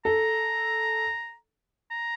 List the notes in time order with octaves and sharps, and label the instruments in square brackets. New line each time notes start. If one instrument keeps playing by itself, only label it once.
[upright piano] A4 [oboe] A#5
[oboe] A#5